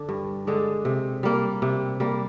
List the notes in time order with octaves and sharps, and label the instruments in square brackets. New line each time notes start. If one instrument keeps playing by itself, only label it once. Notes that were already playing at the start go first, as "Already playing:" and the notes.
Already playing: [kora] D3 D4
G2
D3 G#3 D4
C3
G3 A#3
C3
G3 A#3